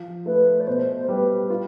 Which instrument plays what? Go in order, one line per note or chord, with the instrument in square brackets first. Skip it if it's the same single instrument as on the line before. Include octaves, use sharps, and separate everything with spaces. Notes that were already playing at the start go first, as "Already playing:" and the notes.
Already playing: [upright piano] F3 F4
[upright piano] A3 [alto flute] B4
[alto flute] D5
[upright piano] B2 [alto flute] C5
[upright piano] G3 [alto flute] B4
[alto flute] D4 [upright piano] F4